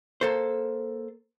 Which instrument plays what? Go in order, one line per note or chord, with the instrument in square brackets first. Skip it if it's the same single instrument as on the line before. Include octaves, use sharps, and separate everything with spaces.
[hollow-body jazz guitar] A#3 A4 C5